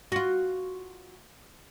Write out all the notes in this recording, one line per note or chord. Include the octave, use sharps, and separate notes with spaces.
F4 F#4